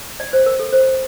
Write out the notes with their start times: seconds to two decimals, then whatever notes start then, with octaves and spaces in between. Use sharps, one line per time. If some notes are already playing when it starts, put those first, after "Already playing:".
0.20 D5
0.33 C5
0.46 A#4
0.60 A4
0.73 C5